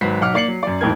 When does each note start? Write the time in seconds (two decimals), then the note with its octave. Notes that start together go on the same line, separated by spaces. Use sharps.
0.01 G#1 F#3 F#4 B4 B6 C7
0.21 B1 F#3 F#5 D6 F6
0.34 A#3 D5 C7 C#7 F#7
0.48 F#3
0.63 F#2 D5
0.81 D#1 A1 F2 D#3 A#4 G#6